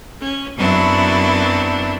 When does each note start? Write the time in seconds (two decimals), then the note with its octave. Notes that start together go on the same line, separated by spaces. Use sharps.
0.21 C#4
0.56 F#2 F#3 B3 C4 D4 E4